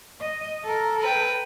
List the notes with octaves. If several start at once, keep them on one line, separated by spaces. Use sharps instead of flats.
D#5
A4 A#4
B4 G5